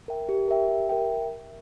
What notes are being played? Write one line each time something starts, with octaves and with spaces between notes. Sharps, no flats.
A#4 E5 G5
G4
A#4 E5 G5
G4
A#4 E5 G5